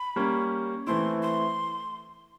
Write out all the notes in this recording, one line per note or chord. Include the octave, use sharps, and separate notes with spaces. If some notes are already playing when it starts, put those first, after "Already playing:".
Already playing: B5
G3 A#3 C#4
E3 A3 C4 E4 C6
C6